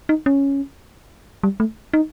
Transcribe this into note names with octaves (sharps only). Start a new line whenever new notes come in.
D#4
C#4
G3
A3
D#4